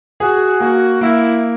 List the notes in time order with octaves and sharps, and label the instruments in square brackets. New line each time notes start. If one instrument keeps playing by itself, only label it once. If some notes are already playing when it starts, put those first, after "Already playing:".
[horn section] F#4 [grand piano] G#4
[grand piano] A#3 [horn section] F#4
[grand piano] A#3 [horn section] E4